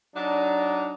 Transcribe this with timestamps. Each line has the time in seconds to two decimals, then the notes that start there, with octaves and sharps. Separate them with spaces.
0.14 F#3 D4 D#4